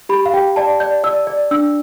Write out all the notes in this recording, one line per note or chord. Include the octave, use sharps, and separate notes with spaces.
G4 B5
F5
G4 G5
D5 A5
D5 G6
D5 E6
D5
D4 E6